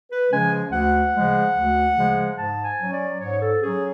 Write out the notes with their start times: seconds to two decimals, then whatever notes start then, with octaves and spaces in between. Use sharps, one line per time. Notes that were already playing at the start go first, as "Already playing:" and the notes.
0.10 B4
0.30 C#3 F3 G#3 C#4 G#5
0.71 D2 F#5
1.13 C#3 F3 G#3
1.55 D2
1.95 C#3 F3 G#3
2.37 G#2 A5
2.64 G#5
2.78 F#3 C#4
2.92 D5
3.20 G#2 C#5
3.40 A4
3.62 F#3 C#4 G#4